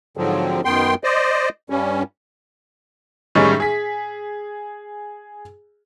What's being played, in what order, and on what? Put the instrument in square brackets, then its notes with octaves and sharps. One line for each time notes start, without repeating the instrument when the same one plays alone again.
[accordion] G#2 D3 F3 F#3 C4
F#2 D#3 B3 G5 C6
C5 D5 D#5
G2 G3 C#4
[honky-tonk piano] A2 D#3 G3 G#3 C#4 D#4
G#4 B6